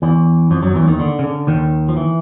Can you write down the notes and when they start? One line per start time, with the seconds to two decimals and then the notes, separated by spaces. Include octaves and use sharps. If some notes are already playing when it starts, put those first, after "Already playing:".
0.02 E2 E3
0.51 F2 F3
0.63 F#2 F#3
0.75 E2 E3
0.87 D#2 D#3
0.99 D3
1.19 C#3
1.24 D3
1.47 D#2 D#3
1.88 F3
1.97 E3